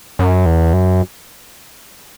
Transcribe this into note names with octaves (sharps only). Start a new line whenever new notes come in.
F#2
E2
F#2